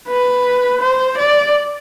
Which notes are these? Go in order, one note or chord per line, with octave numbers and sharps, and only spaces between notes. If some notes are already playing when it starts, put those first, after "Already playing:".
B4
C5
D5